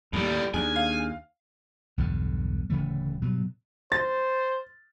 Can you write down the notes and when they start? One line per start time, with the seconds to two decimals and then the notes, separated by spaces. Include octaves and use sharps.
0.13 D#2 A2 G3
0.54 D#2 A#2 D4 G#4 G#5
0.76 F5
1.98 B1 E2 G2 D3
2.70 D1 C#3 E3 A3
3.22 G2 B2 F#3
3.92 C5 A6